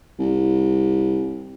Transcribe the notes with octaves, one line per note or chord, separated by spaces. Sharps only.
C2